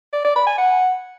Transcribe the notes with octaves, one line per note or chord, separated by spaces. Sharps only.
D5
D5
B5
G#5
F#5